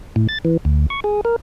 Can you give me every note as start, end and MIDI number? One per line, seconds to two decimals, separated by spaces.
0.16 0.27 45
0.29 0.39 93
0.45 0.57 52
0.65 0.86 38
0.90 1.00 85
1.04 1.21 68
1.25 1.36 70